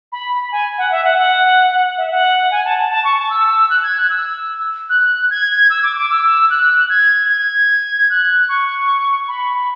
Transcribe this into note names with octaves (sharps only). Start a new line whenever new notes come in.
B5
G#5
F#5
E5
F#5
F#5
F#5
E5
F#5
G#5
A5
A5
A5
C#6
A5
E6
F#6
G#6
F#6
E6
F#6
G#6
E6
D6
D6
E6
F#6
G#6
G#6
F#6
C#6
B5